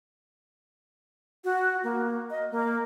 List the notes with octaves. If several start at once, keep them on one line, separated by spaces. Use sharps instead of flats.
F#4
A#3
D#5
A#3